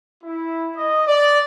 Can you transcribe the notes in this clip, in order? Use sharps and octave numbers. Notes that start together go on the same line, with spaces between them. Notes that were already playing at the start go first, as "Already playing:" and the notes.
E4
D#5
D5